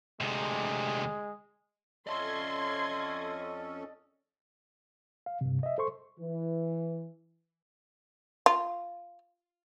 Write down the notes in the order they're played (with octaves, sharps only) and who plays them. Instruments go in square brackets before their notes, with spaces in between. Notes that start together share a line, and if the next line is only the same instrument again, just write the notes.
[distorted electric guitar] D2 C3 [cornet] G#3
[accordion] F2 C#4 A4 [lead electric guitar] D5 D#5 [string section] C6 G#6
[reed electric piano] F5
G2 C3
D#5 E5
A4 C5 C6 C#6
[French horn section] E3
[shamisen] F4